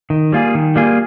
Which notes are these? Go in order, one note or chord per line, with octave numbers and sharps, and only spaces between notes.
D#3
G3 A#3 F4 G#4
D#3
G3 A#3 F4 G#4